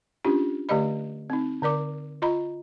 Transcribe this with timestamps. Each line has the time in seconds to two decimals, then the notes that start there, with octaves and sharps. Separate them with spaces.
0.25 C#4 D4 F4 G4
0.69 D3 A3 G4 D5 D#5 B5
1.30 C4 D#4
1.62 D3 A#4 D5 D6
2.22 F4 D#5 A#5 B5